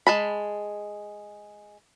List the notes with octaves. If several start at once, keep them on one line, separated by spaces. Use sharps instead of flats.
G#3 A5 B5